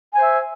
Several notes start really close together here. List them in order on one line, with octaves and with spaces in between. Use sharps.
G#5 C5 E5